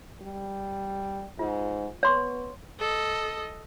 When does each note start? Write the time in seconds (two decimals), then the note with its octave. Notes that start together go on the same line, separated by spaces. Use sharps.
0.22 G3
1.39 G#2 F4
2.03 B3 C#5 C6 C#6
2.80 A4 D#5